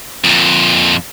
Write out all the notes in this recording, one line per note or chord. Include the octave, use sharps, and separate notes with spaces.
F2 A#2